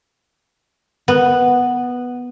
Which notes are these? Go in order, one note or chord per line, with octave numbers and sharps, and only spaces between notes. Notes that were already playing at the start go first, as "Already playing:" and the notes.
B3